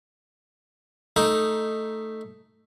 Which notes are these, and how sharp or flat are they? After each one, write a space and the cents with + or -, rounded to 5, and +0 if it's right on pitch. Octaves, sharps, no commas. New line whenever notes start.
A3 +0 D#4 +0